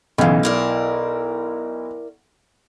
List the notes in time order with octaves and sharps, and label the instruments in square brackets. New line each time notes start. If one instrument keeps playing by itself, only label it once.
[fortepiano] B1 F5 [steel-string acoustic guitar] C#3 E3
[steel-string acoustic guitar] E4 A#4 D5